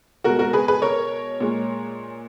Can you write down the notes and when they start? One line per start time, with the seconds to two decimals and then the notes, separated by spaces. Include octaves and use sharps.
0.24 B2 G#3 F#4 A#4
0.39 F#4 A#4
0.53 G#4 B4
0.68 G#4 B4
0.82 A#4 C#5
1.40 A#2 G#3